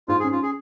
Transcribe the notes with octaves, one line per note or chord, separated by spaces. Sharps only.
G#2 F4
G#4
C#4
F4
G#4